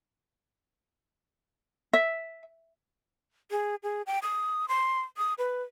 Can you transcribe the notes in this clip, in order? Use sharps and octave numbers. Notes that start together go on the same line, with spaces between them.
E5
G#4
G#4
G5
D#6
C6
D#6
B4